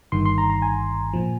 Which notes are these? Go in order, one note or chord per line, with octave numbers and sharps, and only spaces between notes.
G1 G2 D#3 C6
C6
A#5
A#5
G#5
A#2 F3